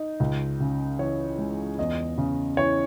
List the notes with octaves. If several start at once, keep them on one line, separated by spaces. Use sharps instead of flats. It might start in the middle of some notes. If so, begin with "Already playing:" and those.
Already playing: D#4
C#2
C#3
E3 C#5
G#3
E2 D#5
C#3
E3 C#5